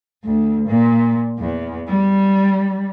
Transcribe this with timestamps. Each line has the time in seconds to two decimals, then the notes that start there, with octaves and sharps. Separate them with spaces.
0.23 D2
0.67 A#2
1.38 E2
1.88 G3